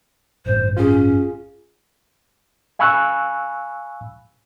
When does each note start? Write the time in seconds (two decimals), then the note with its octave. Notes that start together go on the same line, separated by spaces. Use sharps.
0.46 A1 G2 C5
0.77 C#4 F4 G#4
2.79 F5 G#5 B5 C#6 E6 F#6